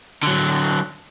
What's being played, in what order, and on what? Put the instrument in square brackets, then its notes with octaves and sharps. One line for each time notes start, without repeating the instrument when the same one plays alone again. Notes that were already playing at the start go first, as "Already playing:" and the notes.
[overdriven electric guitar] D3 F#3